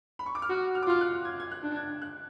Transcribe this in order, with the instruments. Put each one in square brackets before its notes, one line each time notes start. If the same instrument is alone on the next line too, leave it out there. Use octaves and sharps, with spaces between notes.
[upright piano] B5
C#6
D6
F6
[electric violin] F#4 [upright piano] F#6
[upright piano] F6
D6
[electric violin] F4 [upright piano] F6
[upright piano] F#6
G#6
G#6
F#6
[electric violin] D4
[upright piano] G#6
F#6